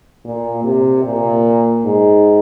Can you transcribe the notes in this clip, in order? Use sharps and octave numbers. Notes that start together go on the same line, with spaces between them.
A#2
C3
A#2
G#2